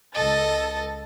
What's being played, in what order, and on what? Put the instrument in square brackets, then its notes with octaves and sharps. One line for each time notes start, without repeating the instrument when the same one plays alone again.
[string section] C#2 A4 A6 [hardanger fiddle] D#5